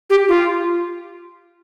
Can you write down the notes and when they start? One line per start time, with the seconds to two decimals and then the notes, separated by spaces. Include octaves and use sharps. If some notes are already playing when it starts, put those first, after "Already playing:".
0.10 G4
0.28 F4